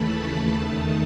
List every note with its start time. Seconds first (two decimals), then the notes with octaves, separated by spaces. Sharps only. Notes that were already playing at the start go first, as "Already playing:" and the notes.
Already playing: D#2 C#3 E3 A3 A5 B5
0.50 E2 D#3 A3 D#4